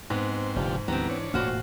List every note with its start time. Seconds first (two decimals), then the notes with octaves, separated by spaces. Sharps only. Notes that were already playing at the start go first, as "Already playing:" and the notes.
0.10 G#2 B3 C4
0.56 F1 D3 F4 G4
0.88 D2 E3 G3 B3 C4 A#5
1.09 D4 C#5
1.34 E1 A2 A#3 F4 F#4 C5